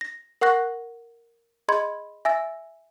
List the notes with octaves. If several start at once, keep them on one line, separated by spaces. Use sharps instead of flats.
A#6
A#4 F#5 C#6 F#6 A#6
G#4 D#5 B5 C6 G#6
E5 G#5 E6 A6 A#6